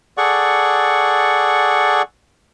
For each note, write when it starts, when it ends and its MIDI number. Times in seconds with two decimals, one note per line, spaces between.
0.18 2.02 68
0.18 2.02 69
0.18 2.02 74
0.18 2.02 78
0.18 2.02 85